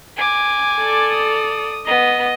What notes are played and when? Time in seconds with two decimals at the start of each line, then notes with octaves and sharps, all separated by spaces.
0.17 G#5 D6
0.79 A4 D5
1.10 D#6
1.87 B3 D#5